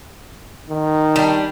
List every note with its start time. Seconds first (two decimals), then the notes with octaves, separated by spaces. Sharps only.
0.69 D#3
1.16 G3 D4